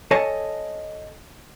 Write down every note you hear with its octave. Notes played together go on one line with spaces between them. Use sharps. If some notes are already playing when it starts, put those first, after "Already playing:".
A4 C#5 D#5 G#5 A5